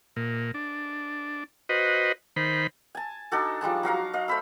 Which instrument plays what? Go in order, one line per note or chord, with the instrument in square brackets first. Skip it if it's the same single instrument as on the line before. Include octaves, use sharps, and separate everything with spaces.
[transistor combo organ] A#2
D4
F#4 B4 C5 D#5
D#3 C5 B5
[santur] G#5 A5
D4 D#4 F#4 A4
F3 G3 G#3 A5
F#3 F#4 F5 A#5
D#5 F5
A3 C5 B5 E6